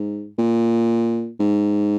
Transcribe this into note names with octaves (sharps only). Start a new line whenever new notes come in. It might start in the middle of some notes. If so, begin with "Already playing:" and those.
Already playing: G#2
A#2
G#2